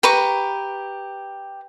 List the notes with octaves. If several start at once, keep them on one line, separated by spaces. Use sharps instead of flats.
G4 B4 A#5 C#6